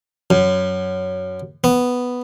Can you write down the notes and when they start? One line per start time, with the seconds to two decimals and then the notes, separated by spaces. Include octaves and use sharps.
0.30 F#2
1.64 B3